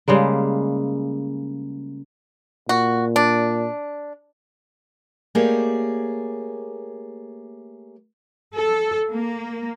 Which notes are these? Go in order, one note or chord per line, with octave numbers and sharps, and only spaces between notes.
C#3 G3 G#3 A#3
A#2 F#4
D4
A3 A#3 G4 G#4 C#5 D5
A4
A#3